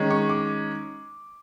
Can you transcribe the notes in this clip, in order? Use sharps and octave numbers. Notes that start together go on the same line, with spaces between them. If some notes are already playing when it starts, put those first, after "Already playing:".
Already playing: D#3 G#3 C#4
C#6
D6